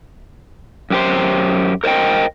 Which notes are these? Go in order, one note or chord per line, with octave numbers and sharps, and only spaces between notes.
F#2 G4 C5
A#4 C5 D#5 G5